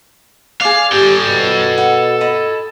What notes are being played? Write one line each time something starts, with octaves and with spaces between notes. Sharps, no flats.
G#4 D5 F5
G4 A4 G5
B2
F#5
D#5 B5